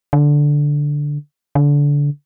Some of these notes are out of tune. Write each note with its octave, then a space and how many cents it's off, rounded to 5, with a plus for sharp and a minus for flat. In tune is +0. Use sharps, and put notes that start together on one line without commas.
D3 -5
D3 -25